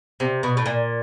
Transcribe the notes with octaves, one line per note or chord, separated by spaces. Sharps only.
C3
B2
A2
A#2